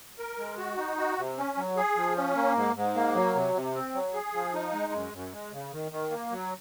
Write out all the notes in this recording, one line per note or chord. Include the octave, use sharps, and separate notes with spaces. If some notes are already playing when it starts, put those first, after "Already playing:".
A#4
G#3
F#4
D#4
F#4
C3
C#4
F#3
G#4
F3
C#4
A#3
G#2
G#2
A#3
F#3
C3
C3
C4
F#3
G#4
F3
D#4
G#3
F#2
F#2
G#3
C#3
D#3
D#3
A#3
F#3